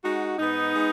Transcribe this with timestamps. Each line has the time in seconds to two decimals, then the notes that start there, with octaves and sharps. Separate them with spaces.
0.02 G#3 D#4 F#4
0.38 G#2 B3 D#4
0.74 G#3